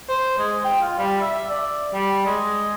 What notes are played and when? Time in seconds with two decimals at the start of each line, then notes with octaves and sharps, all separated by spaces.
0.09 C5
0.39 G#3
0.64 G5
0.81 F4
0.98 G3
1.22 E5
1.50 D5
1.93 G3
2.26 G#3